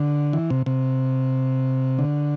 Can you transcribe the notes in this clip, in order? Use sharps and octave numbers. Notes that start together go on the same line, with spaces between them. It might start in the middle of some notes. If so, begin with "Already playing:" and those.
Already playing: D3
E3
C3
C3
D3